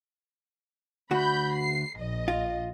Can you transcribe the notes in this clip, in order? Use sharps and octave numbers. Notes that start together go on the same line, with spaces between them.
D2 F#4 B5 G6
C7
A#1 D#5
F4